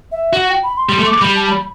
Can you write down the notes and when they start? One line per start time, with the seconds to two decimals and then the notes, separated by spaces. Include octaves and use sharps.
0.12 E5
0.33 F#4 F#5
0.49 G5
0.63 B5
0.77 C6
0.89 G3 C6
0.99 A3
1.06 D6
1.21 G3 B5
1.36 A5
1.50 B5